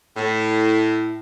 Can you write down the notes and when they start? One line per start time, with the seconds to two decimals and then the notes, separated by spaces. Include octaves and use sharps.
0.17 A2